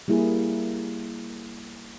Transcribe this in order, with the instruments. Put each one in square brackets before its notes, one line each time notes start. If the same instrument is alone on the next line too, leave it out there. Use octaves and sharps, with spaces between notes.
[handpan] G3 A#3 E4 G#4